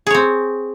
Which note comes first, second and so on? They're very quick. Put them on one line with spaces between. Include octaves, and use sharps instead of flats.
G#4 C#5 C4